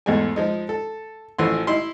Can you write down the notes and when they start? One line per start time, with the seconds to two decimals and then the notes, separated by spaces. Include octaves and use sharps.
0.06 E2 G#2 G#3 A3 G#5
0.36 F3 G#3 D#4
0.69 A4
1.39 A1 E3 F3 A3 F#5 C6
1.67 D#4 E4 C6